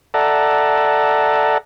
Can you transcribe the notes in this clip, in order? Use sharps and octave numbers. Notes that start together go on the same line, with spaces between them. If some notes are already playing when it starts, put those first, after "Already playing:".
A4 D5 E5 F#5 A5 A#5